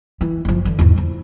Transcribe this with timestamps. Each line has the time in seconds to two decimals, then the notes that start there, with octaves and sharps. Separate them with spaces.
0.21 E3
0.45 F#1 F3
0.65 D3 E3
0.79 E2 G#2
0.96 F3 E4